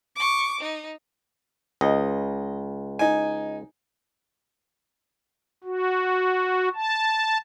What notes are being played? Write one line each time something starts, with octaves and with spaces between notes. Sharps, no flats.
C#6 D6
D#4
C#2 D#5
D#4 G#5
F#4
A5